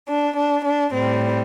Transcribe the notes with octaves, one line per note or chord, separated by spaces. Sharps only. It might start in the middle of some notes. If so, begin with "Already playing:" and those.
D4
D4
D4
A2 G3 C4